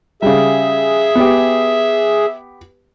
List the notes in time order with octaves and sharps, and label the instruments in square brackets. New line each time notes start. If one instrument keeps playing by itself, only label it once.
[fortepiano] C#3 G3 [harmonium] G#4 [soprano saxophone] E5
[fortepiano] B3 G4